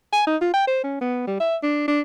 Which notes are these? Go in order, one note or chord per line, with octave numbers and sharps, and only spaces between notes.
G#5
D#4
F4
G5
C5
C#4
B3
G3
E5
D4
D4